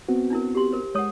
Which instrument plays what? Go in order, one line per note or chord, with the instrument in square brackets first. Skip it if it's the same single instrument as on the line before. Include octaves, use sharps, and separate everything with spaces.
[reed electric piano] B3 C4 F#4
[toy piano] D4 E4 A#4
G4 C6
A#4 C5
[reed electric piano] G#3 D#6 [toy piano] C#5 F#5